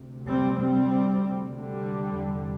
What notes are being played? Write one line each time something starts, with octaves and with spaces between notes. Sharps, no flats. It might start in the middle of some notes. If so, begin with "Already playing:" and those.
Already playing: D2 C3
G3 C4
G3 C4
D3 G3
E2 C3